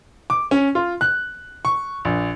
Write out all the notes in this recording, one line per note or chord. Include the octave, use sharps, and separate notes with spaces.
D6
C#4
F4
F#6
C#6
A#1